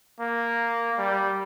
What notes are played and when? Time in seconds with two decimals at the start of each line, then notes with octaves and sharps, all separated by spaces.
0.20 A#3
0.98 G3